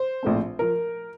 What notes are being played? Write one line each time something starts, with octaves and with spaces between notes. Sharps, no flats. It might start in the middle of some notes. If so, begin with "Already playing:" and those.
Already playing: C5
A#1 A2 A3 C4
F3 A#4